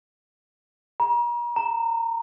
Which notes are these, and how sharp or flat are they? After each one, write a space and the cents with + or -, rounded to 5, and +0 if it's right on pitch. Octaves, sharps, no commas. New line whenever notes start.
A#5 +40
A#5 -25